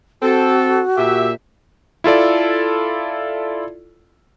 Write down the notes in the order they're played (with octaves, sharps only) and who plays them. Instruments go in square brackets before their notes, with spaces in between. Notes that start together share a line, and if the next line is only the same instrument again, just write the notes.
[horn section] C4 A4 [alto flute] F#4
[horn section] A#2 G4 E5
[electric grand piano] E4 F4 A4 D5